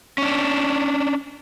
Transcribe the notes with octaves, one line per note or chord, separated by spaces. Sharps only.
C#4 D4